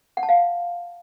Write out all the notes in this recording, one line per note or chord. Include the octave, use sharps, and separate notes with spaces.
F#5
A5
F5